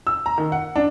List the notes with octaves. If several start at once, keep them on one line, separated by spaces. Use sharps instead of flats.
E6
A#5
D#3
F#5
D4